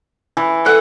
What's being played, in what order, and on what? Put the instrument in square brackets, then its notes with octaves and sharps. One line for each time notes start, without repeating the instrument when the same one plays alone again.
[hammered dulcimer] E3
[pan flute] A4 [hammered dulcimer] F#5